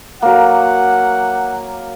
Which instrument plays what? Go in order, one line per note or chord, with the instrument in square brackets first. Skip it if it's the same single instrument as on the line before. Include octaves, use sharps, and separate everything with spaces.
[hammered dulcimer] F#3 A#3 [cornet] F#5